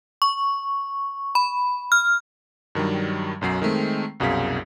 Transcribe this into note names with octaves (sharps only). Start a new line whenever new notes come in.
C#6
B5
F6
G2 D#3 F#3 G3
B1 F#2 F#3 C7
D#3 G#3 A3 C4
C2 F#2 B2 G#4 F5 B6